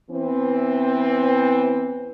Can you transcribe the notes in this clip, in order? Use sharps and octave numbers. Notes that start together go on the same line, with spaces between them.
E3 B3 C4